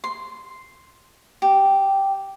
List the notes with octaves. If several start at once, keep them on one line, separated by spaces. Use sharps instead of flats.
C6
G4